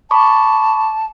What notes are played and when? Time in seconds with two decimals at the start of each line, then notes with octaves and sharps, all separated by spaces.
0.11 A5 B5 C#6 D6